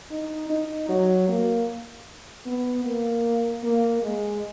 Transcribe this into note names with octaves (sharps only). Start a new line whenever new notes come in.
D#4
D#4
F#3
A#3
B3
A#3
A#3
G#3